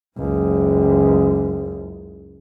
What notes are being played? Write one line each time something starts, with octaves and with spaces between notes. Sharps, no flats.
F#1 C#2